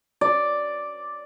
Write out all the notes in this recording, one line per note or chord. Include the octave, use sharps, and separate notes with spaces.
D5